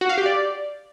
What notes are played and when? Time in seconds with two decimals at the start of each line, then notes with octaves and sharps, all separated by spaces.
0.01 F#4
0.09 F5
0.18 G4
0.26 D5